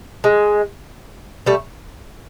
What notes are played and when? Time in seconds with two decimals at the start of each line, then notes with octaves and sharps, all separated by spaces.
0.24 G#3
1.46 G3 A3